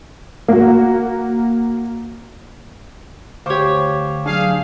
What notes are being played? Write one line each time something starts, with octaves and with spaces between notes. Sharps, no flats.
A#3 F#4
D2 G4 C5 C#5 F5 C#6 D6
F#3 D4 G#4 F5